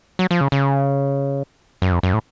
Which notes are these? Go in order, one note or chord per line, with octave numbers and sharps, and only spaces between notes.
F#3
F3
C#3
C#3
F#2
F2
F#2
A2